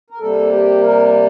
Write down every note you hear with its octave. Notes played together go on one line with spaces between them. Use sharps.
A#4
C3 G3 A#3 A4
G4
A#4